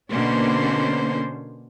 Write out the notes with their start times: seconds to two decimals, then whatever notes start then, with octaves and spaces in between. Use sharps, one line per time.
0.11 B2 D3 A#3 C#4 D4 C5